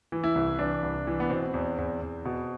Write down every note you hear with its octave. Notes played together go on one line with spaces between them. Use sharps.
E3
E4
C2
E3 D4
C2
E3
B3
B2 C4
E2
E2
E2
B2